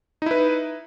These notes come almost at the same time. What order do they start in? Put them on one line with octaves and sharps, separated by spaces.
D#4 E4 B4